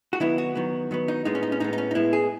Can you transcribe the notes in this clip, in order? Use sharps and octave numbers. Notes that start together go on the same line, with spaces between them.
F#4
D#3 F#3 B3 E4
F#4
D#3 F#3 B3
D#3 F#3 B3
D#4
A2 G#3 B3 D#4
C#4
D#4
C#4
A2 G#3 B3 D#4
D#4
C#4
D#4
A2 G#3 B3 E4
G#4